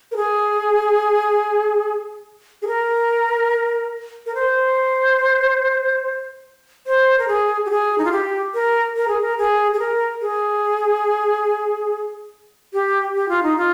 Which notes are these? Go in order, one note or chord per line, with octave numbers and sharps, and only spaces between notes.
A#4
G#4
G#4
A#4
A#4
C5
C5
A#4
G#4
G4
G#4
D#4
F4
G4
A#4
A#4
G#4
A#4
G#4
G#4
A#4
G#4
G4
G4
F4
D#4
F4